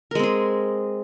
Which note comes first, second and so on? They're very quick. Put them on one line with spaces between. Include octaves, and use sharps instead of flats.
A#4 G#3 C4 G#4